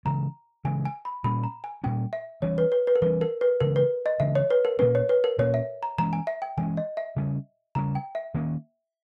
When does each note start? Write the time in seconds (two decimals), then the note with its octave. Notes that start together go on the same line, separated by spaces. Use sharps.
0.05 C#3 E3 G#3 A#5
0.65 C#3 E3 G#3 G#5
0.85 G#5
1.05 B5
1.24 A#2 G3 A#3 C#4 B5
1.44 A#5
1.64 G#5
1.84 A#2 G3 A#3 C#4 G5
2.13 E5
2.42 E3 G3 C#4 C#5
2.58 B4
2.72 B4
2.87 B4
2.96 A#4
3.02 E3 G3 C#4 B4
3.21 A#4
3.41 B4
3.60 C#3 E3 G#3 A#4
3.76 B4
4.06 D#5
4.20 C#3 E3 G#3 E5
4.35 C#5
4.50 B4
4.65 A#4
4.79 A#2 A#3 C#4 B4
4.95 C#5
5.09 B4
5.24 A#4
5.38 A#2 A#3 C#4 C#5
5.54 E5
5.83 A#5
5.98 E3 G#3 C#4 A#5
6.13 G#5
6.27 E5
6.42 G5
6.57 E3 G#3 C#4 G#5
6.77 D#5
6.97 E5
7.16 C#3 G3 C#4
7.75 C#3 G3 C#4 A#5
7.95 G5
8.15 E5
8.34 D#3 A#3 C#4